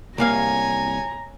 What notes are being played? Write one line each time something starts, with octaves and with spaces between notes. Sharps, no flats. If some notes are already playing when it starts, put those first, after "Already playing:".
C2 A#3 C#5 F5 G#5 A#5